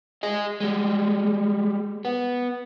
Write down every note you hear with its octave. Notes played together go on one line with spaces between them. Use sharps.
G#4 D#5
G3 G#3
B3